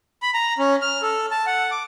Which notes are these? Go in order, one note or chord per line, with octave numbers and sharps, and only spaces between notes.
B5
A#5
C#4
F6
A4
A5
F#5
D6